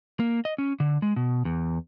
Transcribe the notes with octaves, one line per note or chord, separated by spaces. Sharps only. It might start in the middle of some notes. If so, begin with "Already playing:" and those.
A#3
D#5
C#4
D3
G#3
B2
E2